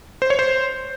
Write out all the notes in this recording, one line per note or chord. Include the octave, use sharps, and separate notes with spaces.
C5
C#5
C5